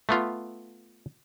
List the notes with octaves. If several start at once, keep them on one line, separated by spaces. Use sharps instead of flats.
A3 B3 F4